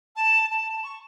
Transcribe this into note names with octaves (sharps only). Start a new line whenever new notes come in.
A5
A5
C#6